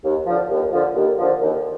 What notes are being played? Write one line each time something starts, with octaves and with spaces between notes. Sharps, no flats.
D#2
D3 F3
D#2
D3 F3
D#2
D3 F3
D#2